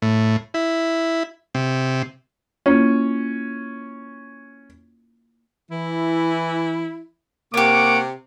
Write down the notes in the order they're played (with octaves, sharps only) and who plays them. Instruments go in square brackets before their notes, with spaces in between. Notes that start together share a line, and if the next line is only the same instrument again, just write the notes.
[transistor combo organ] A2
E4
C3
[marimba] A#3 E4 F4 [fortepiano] C#4
[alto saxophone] E3 [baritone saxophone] E4
[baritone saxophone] C3 [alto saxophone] A#3 [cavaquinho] G4 C#5 [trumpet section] F#5 C#6 D6